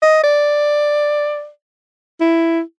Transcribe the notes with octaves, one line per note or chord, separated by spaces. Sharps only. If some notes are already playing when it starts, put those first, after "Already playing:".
D#5
D5
E4